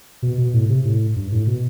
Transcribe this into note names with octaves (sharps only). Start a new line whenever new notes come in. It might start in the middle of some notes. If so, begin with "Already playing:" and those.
B2
B2
A2
C3
A2
G2
A2
B2